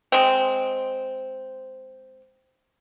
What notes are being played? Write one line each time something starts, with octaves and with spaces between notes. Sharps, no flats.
G#3 C4